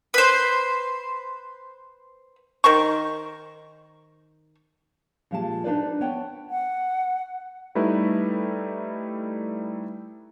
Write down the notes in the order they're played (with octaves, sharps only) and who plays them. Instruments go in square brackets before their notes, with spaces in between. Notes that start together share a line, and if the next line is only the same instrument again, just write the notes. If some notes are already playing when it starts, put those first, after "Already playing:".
[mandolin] B4 C5
[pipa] D#3 A#4 C5 C#6
[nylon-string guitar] A#2 F3 G#3 G4 G5 A5
D4 D#4 B4 C5 D5
B3 B4 C#5 F#5 G5 A5
[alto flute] F#5
[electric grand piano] G3 A3 D#4 E4 B4